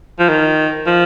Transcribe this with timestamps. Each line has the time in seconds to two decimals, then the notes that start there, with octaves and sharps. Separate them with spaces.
0.19 F3
0.29 D#3
0.86 F3